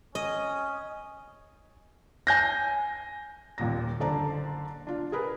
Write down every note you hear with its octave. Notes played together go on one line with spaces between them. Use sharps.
C#4 D#5
G#5 G6 A#6
D#1 D#2 A#2 A#6
F#1 D3 C5 D5 A5 A#5
D4 F4
G#4 A#4 B4